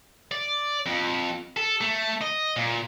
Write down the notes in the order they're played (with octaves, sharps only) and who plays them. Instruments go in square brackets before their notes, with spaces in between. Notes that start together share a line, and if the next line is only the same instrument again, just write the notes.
[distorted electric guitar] D5
F2
A4
A3
D#5
A#2